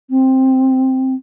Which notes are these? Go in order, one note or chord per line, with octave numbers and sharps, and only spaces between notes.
C4